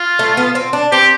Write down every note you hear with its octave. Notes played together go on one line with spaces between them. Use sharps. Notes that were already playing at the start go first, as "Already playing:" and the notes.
Already playing: F4
A3
B3
C4
D4
C4 G4